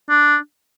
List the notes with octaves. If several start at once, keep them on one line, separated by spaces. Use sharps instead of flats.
D4